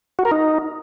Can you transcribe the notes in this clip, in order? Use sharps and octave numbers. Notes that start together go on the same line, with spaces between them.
F#4
A#4
D#4